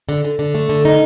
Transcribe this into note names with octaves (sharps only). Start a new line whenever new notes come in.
D3
D3
D3
A3
D3
D#4